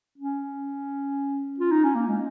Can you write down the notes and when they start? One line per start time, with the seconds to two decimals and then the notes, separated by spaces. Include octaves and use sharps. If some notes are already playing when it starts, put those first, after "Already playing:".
0.18 C#4
1.60 F4
1.71 D#4
1.84 C#4
1.95 A#3
2.08 G#3